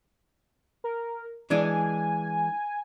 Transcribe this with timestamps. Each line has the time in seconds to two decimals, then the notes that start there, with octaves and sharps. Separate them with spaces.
0.84 A#4
1.50 E3 G#3 D4 G#5